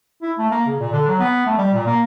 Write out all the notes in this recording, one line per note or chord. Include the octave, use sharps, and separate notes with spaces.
E4
A3
A#3
C#3
A#2
D3
F#3
B3
A3
G3
A#2
A#3